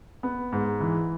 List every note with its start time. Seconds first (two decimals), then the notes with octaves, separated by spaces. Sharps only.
0.23 B3
0.52 G#2
0.80 E3